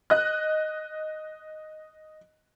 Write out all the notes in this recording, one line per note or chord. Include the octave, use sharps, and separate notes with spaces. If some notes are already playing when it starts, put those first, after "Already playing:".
D#5 F#6